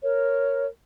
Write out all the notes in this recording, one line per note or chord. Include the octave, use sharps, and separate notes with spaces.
A#4 C#5